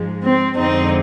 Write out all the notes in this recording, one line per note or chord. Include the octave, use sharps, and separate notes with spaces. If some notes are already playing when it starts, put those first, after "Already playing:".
Already playing: G#2 F3 G#3
C4
F2 D3 G#3 C4 D#4